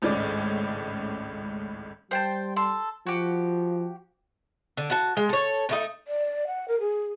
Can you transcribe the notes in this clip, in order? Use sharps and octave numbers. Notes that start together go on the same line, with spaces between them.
G#1 C#2 A2 C#4 D5
G3 C5 G5 A5
A4 C6
F3 F#4 G4
D3
F#4 A5
G#3
A4 C#5
D3 A3 D#4
D5
F#5
A#4
G#4